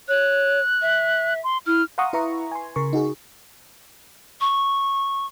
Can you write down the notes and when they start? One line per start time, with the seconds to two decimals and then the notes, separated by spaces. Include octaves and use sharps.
0.08 C#5 F#6
0.82 E5
1.44 C6
1.66 E4 F6
1.98 F5 F#5 A#5 C6 C#6 D#6
2.13 E4 B4 E5 A#5 C#6
2.52 G#5 C6
2.76 C#3 A#4 C#6
2.93 D#4 F#4 G#4
4.41 C#6